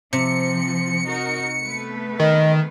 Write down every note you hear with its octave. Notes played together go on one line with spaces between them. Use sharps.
C3 F3 C4 C#7
D#4 F#4 A#4
A3 B3 B4
D#3 D#5